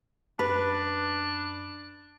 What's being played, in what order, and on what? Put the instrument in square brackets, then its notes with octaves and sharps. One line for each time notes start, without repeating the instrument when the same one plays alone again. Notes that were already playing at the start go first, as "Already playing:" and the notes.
[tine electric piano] F#2 [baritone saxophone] D4 [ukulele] B4